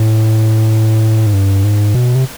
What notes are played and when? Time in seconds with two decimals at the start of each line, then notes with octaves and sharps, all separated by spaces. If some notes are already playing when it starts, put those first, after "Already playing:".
Already playing: A2
1.26 G#2
1.33 G2
1.64 G#2
1.95 B2
2.15 C3